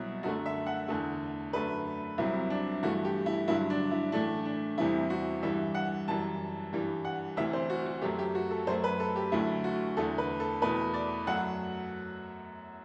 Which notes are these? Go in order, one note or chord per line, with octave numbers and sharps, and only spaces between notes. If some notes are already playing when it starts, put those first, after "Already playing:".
Already playing: C2 B2 F#3 E4
F#2 D3 A3 F#4
E5
F#5
E2 D3 A3
F#2 D3 A3 B4
C2 C3 F#3 E4
D4
G2 E3 A3 F#4
G4
E4
G2 D3 F#3 E4
D4
E4
A2 E3 A3 D4
D4
E2 C3 E3 G3 E4
F#4
G2 E3 G3 E5
F#5
F#2 E3 G3 A5
G2 E3 G3
F#5
D2 C3 E3 E5
C5
F#4
F#4
F#2 F#3 A3 G4
G4
F#4
A4
F#2 F#3 A3 C5
B4
A4
G4
D2 D3 F#3 A3 E4
F#4
E2 D3 A3 A4
B4
A4
E2 B2 A3 B4
D5
F#2 F#3 A3 F#5